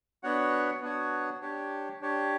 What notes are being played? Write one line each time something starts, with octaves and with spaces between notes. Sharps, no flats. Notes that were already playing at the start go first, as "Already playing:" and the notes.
B3 D4 F#4 C#5 F#5
B3 D4 F#4 C#5 F#5
D4 G4 C#5
D4 G4 C#5